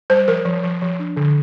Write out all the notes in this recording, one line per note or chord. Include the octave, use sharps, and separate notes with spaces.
G3 C5
F3 A#4
F3
F3
F3
D4
D3